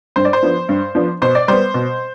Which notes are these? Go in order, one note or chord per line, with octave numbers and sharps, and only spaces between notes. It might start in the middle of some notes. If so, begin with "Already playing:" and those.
G2 C5
D5
C5
F3 B3 D4
G2
F3 B3 D4
B2 C5
D5
G3 B3 C5
B2